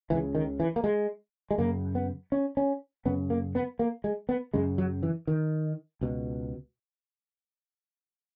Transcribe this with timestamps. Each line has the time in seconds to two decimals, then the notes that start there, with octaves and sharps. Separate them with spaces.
0.10 C#2 C#3 E3
0.35 D#3
0.60 E3
0.76 A#3
0.84 G#3
1.51 G#3
1.58 F#2 C#3 A#3
1.95 B3
2.32 C#4
2.57 C#4
3.05 F#2 C#3 B3
3.30 A#3
3.55 B3
3.79 A#3
4.04 G#3
4.29 B3
4.54 F#2 C#3 G#3
4.78 F#3
5.03 E3
5.27 D#3
6.01 C#2 B2